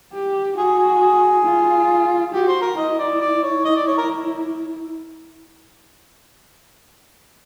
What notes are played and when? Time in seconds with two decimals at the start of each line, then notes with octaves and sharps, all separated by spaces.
0.13 G4
0.57 F#4 G#4
0.78 G#4
1.01 G#4
1.45 F4
2.33 F#4 G4
2.47 C5
2.62 A#4
2.77 E4 D#5
2.98 D5
3.21 D5
3.43 C#5
3.65 E4 D#5
3.75 D5
3.87 C#5
3.98 A#4